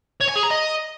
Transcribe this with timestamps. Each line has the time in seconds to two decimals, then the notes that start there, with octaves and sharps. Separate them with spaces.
0.21 C#5
0.28 G#5
0.35 G#4
0.43 A#5
0.50 D#5